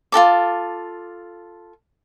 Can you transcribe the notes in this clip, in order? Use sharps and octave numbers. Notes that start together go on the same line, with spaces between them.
F4 F#4 A4 D6